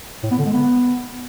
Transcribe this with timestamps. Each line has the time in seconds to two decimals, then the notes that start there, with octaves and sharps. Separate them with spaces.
0.23 A2
0.31 B3
0.38 D3
0.46 G#3
0.53 B3